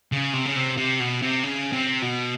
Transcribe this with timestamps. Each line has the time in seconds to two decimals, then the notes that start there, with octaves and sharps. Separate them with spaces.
0.12 C#3
0.34 C3
0.46 C#3
0.56 C3
0.77 C3
1.00 B2
1.22 C3
1.44 C#3
1.72 C3
2.02 B2